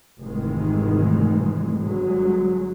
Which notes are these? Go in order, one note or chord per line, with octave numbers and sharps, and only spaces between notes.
F1 G#2 C3 D#3 E3 G#3
G1 F#3 G#3